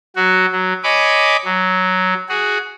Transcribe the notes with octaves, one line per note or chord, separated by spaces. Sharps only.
F#3 F#4
F#3
C#5 D#5 G#5 B5 D6
F#3
F#4 G#4